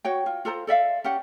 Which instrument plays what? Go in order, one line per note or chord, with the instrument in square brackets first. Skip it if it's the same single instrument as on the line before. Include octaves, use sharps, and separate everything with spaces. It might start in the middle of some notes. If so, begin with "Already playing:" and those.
[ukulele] F#4 C#5 G5
F4
F4 A4 C5 A#5
A4 D5 E5 F5
C#4 G4 F#5